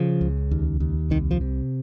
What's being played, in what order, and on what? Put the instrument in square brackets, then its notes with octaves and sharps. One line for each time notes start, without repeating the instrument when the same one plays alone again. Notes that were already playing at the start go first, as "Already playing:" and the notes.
Already playing: [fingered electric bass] C#3 F3
C#2
D#2
D#2
C2 D#3
F3
C3